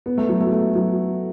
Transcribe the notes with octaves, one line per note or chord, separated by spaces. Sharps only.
B3
A3
F#3
A3
A3
F#3